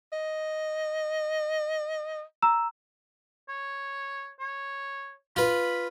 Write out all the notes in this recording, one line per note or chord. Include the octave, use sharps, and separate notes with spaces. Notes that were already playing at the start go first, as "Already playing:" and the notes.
D#5
A#5 E6 E7
C#5
C#5
F4 B4 B5